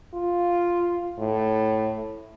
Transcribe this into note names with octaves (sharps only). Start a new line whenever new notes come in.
F4
A2